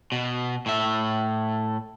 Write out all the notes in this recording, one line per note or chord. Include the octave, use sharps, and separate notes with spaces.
B2
A2 E5